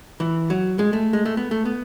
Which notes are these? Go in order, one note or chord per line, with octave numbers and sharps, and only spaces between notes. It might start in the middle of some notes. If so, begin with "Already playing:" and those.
E3
F#3
G#3
A3
G#3
A3
B3
A3
B3